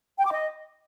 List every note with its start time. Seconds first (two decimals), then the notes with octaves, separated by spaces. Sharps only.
0.18 G5
0.25 D6
0.32 D#5